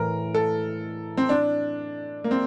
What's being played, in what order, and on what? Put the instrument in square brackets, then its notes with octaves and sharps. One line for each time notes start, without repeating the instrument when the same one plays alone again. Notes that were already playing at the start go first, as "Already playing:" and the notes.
Already playing: [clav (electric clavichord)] A2 E3 [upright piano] A#4
[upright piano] A4
C4
D4
A#3
C4